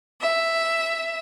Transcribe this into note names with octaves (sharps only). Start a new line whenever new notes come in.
E5